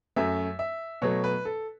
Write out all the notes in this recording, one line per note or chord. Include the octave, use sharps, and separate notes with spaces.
F#2 F#3 A3 E5
E5
B2 F#3 A3 C#5
B4
A4